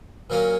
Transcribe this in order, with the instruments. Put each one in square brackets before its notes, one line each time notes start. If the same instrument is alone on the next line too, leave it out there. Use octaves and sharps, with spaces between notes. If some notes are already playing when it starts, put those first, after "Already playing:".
[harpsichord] A#2 F#3 A#3 C#4